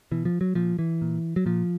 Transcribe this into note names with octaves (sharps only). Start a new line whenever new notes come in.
B2 E3
F3
F#3
A#2 F3
E3
A#2
F#3
A#2 F3